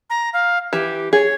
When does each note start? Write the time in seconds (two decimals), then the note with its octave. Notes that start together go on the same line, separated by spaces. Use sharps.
0.10 A#5
0.33 F5
0.73 E3 G4
1.13 G#4 C#5